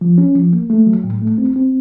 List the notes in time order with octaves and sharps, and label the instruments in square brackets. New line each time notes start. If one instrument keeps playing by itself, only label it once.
[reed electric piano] F3
C#4
F3
A#3
A3
F#3
A2
A3
C4
C4